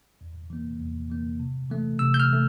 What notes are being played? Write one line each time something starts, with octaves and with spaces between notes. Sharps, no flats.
E2
E3 A#3
E2
E3 A#3
C3
E3 A3
C3 E6
G6
F6
E3 A3